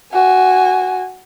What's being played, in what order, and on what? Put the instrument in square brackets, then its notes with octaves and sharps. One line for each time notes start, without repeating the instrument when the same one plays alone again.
[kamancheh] F#4 G#5